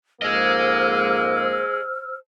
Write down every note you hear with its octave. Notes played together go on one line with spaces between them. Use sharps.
F2 G#2 A#3 G#4 C5 D#5 E6 F6